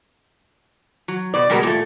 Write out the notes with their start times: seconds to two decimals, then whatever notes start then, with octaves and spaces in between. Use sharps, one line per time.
1.08 F#3
1.34 B2 D5
1.50 B2 G3 G#3 F#4 A#4
1.63 A#2 A3